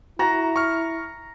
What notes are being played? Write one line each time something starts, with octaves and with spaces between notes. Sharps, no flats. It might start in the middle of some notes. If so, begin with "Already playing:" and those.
E4 F#4 A#5
C#6 F6